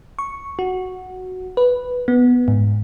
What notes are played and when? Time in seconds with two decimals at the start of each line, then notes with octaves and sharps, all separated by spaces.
0.19 C#6
0.59 F#4
1.57 B4
2.08 B3
2.48 G#2